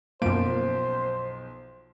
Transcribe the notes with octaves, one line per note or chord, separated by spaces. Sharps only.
B1 F#2 F3 A#3 C5 D7